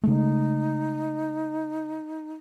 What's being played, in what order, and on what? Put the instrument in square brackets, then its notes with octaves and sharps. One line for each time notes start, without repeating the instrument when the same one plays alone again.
[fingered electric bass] C#3 G#3 A3 [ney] D#4